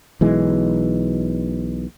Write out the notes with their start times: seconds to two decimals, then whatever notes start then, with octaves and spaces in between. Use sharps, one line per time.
0.21 B1 E3 G#3